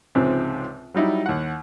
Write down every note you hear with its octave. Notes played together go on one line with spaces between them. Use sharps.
C#2 G#2 C3 F3 C4
F#3 G3 D#4 E4
D#2 F#5